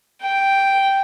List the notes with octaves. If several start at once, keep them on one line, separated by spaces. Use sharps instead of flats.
G5